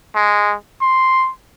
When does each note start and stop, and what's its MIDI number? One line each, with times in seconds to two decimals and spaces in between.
0.15 0.55 56
0.81 1.30 84